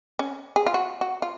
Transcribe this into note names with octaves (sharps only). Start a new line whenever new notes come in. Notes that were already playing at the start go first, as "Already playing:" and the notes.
C#4
G#4
F4
F#4
F#4
F4